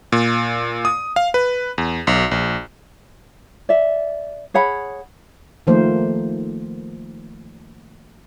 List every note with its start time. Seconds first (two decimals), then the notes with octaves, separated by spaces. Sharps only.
0.12 A#2
0.85 D#6
1.16 F5
1.34 B4
1.78 E2
2.07 B1
2.31 A#1
3.69 D5 E5
4.54 G#4 C#5 F#5 B5
5.67 D#3 F3 A3 A#3 C5